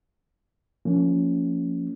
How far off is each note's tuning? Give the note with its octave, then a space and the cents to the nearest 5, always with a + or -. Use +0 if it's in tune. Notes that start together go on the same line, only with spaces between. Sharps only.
F3 +0 A#3 -20 C#4 +15